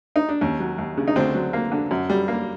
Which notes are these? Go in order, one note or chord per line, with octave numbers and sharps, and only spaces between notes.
D#4
D4
D#2 C#4
F#3
D#2
C#3
D#4
D2 C4 D4
F#3
A#3
D3
F#2
G3
A#3